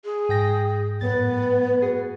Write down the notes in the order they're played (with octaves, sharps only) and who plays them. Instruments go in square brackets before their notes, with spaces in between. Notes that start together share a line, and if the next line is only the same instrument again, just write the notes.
[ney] G#4
[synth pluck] G#2 G5 A#6
[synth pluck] F#2 A2 A6 [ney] B3
[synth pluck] F#4 G#4